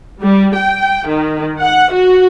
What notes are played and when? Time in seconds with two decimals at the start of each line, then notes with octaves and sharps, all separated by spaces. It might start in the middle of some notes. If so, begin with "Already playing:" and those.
0.23 G3
0.55 G5
1.07 D#3
1.62 F#5
1.93 F#4